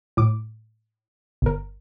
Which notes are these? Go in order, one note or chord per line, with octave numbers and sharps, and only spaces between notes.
A2 D6
G1 A#4